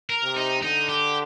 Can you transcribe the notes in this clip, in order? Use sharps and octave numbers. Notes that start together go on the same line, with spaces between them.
A#4
C3
D#4
D3 D#4
G4